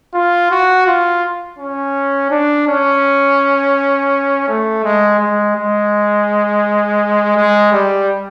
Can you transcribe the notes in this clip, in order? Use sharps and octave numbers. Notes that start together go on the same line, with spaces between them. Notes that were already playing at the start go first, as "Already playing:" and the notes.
F4
F#4
F4
C#4
D4
C#4
A3
G#3
G#3
G#3
G#3
G3